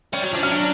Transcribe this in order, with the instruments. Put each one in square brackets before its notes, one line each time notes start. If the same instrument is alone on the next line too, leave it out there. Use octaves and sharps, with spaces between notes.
[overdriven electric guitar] G3 [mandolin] C#4
[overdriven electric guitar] F#3
[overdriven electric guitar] F3 [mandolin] D4
[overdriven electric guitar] F#3 [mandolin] C#4
[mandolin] D4